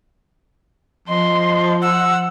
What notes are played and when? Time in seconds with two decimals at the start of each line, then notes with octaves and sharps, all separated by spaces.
1.08 F3 D#5 C6
1.82 F#5 E6